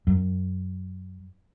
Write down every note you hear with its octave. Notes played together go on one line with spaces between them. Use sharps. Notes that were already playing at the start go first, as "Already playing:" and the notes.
F#2